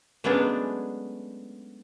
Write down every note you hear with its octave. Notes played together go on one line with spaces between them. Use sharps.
F#3 G#3 A3 B3 C#4 D4